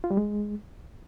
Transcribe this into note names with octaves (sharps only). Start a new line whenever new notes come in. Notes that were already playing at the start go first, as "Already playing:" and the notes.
F4
G3
G#3